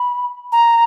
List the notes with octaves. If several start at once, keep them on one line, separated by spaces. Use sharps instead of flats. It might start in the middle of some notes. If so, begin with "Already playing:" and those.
Already playing: B5
A#5